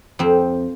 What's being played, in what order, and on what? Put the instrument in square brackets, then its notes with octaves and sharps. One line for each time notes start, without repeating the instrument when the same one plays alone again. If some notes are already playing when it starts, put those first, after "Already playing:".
[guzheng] F2 C4